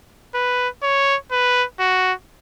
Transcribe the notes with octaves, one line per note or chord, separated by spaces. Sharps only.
B4
C#5
B4
F#4